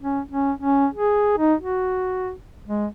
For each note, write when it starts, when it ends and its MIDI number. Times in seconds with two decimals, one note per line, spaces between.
0.01 0.21 61
0.31 0.52 61
0.60 0.87 61
0.94 1.34 68
1.38 1.55 63
1.60 2.32 66
2.66 2.87 56